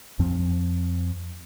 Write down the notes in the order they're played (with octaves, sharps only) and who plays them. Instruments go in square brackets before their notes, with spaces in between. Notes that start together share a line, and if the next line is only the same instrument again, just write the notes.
[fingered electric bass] F2 F3 C4